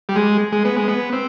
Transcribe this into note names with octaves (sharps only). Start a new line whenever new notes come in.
G3
G#3
G#3
B3
G#3
B3
C4